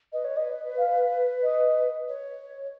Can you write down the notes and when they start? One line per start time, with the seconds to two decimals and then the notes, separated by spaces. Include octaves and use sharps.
0.13 B4 D#5
0.25 C#5
0.37 D#5
0.78 F5
1.43 D#5
2.08 C#5